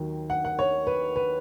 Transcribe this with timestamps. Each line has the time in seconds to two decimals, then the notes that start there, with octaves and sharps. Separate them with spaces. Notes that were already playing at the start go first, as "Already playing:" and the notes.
Already playing: D#2 D#3 F#3
0.30 F#5
0.45 F#5
0.59 C#5
0.87 B4
1.16 B4